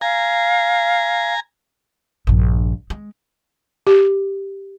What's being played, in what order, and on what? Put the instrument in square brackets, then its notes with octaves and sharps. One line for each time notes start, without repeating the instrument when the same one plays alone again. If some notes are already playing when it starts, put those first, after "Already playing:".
[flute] F5 [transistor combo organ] G#5 A#5
[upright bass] A#1 G2
G#3
[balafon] G4